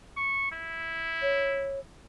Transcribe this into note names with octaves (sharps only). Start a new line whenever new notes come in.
C#6
E4
C#5